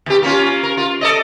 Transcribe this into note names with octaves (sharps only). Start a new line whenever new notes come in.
D#2 G4
A#3 C#4 F4
A#4
F4
A4 D5 D#5